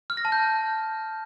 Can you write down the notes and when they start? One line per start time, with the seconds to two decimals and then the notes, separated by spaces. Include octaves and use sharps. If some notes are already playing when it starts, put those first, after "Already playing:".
0.10 F6
0.17 A#6
0.25 A5
0.32 G6